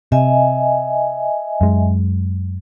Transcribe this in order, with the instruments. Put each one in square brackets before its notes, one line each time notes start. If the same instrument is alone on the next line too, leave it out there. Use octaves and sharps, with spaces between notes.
[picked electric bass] C3 [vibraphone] D#5 E5 G#5
[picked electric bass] F#2 G#3